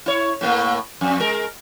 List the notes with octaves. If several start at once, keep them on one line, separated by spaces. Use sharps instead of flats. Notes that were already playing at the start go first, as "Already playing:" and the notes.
E4 C#5
A2 A3 A#3
F2
G#3 A#4